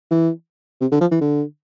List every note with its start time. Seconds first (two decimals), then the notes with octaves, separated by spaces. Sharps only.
0.11 E3
0.81 C3
0.92 D3
1.01 F3
1.11 E3
1.21 D3